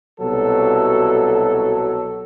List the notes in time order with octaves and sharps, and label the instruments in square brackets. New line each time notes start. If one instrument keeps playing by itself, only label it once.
[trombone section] C2 B2 F#3 A4